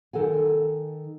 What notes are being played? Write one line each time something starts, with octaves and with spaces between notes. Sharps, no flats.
D#3 A4 F#5 G#5